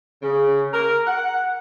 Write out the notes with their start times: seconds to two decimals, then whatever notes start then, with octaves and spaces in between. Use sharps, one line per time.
0.22 C#3
0.73 A#4
1.06 F#5